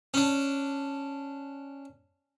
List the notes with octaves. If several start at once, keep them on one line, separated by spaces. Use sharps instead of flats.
C#4 D4